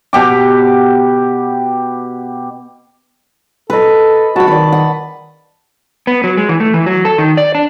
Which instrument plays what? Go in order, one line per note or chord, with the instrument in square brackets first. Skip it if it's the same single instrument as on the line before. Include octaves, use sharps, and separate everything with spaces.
[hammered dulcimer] B2 G4 D6
[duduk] A4 [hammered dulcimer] B4 D#5
[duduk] F#4 [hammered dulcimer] A5 B5
[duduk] D#3 [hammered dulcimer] B4 D5
[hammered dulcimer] F#5
[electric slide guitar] B3
F#3
G#3
E3
A3
E3
F#3
A4
D#3
D5
D4